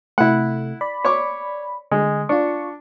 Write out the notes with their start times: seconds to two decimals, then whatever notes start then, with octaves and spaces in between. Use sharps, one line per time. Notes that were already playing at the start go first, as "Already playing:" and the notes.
0.18 C3 A3 E4 F#5
0.81 D5 B5
1.04 C#5 C#6 D6
1.91 D3 G#3
2.29 D4 F4 C#6